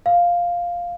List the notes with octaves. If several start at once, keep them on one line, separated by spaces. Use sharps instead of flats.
F5